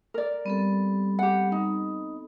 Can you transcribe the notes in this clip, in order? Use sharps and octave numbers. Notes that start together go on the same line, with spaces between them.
A#4 D5
G3 B3 C4 A4
G4 F#5
D#4